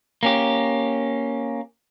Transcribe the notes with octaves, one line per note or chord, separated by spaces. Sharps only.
A#3 C#4 G4